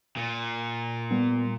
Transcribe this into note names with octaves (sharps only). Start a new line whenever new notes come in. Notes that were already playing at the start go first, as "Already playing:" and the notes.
A#2
G3 B3